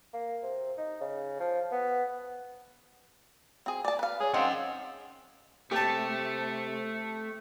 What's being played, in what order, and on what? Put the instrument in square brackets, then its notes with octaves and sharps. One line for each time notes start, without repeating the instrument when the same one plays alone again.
[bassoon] A#3
C3
D#4
C#3
F3
B3
[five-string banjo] C4 G#4
D5 A5
B4 F5
[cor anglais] G#4 [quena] C#5
[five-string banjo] D#3 G#3 [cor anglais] C4 [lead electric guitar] C#4 F#5 [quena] F5
[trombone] C3 [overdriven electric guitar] A3 [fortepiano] G4 A5